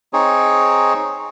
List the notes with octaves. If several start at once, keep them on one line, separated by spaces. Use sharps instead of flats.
C4 D#4 G#4 C#5